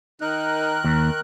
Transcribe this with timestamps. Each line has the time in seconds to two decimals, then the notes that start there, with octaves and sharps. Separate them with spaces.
0.21 D#3 D#4 A#4 F#6
0.84 D#2